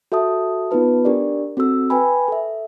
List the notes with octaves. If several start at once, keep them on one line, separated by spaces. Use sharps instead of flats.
F#4 A4 E5 A5 D#6
B3 D#4 F4 B4 A5
D4 G4 A#4 D5
C4 F#4 A4 E6
B4 G5 G#5 B5
A4 E5